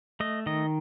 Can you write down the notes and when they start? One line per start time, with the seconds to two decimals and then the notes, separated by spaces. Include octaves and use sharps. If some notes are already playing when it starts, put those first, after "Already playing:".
0.20 A3 D#5
0.46 D#3 D#5